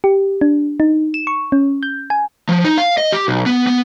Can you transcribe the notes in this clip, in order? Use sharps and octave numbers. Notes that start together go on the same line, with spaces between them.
G4
D4
D#4
E7
C#6
C#4
G6
G#5
F3
D#4
F5
D#5
G4
B1
B3
B3